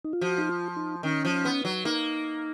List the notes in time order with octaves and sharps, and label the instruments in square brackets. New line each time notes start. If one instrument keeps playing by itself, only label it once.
[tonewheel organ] D#4
F4
[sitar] F3 [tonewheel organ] F#4
[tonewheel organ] D#4
F4
D#4
[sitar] D#3 [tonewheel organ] C#4
[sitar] F3
B3
F#3
[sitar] A#3 [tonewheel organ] D#4